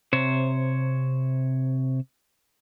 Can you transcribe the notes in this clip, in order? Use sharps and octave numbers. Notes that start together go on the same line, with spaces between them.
C3 C5 C#5